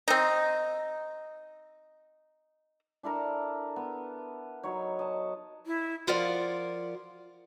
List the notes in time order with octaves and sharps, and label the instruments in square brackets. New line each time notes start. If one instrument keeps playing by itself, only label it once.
[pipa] C4 D#4
[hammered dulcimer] D4 E4 A4 A#4
B3
F#3 D#4 C#5
D#5 A5
[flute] E4
[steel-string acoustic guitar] F3 F4 A#4 D5 F#5